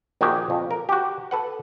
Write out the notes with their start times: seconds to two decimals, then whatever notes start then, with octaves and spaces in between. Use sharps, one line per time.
0.21 A#1 D#3 F#4 G4 G#5
0.50 F2
0.71 A#4
0.89 F#4 G4
1.31 A4 B4 F#5